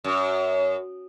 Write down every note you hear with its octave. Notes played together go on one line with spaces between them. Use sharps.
F#2